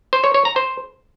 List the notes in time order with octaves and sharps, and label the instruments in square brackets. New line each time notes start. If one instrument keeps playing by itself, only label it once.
[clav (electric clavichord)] C5
C#5
C#5
A#5
C5